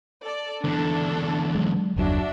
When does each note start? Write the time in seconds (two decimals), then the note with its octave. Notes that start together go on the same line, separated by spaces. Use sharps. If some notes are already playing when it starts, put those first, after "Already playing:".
0.21 A4 D5
0.64 E2 D3 D4 A4
1.55 F#3 G#3
1.96 F#1 D#2 F#3 D4 F#4 E5